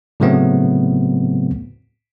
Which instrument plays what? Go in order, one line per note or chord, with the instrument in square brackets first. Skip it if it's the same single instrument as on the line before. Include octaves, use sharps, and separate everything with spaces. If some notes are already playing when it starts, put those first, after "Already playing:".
[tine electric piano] A2 C#3 F#3 A3 B3 C4